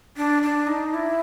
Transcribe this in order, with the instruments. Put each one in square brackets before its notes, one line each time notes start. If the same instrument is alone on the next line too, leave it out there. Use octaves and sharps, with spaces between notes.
[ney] D4
D4
D#4
E4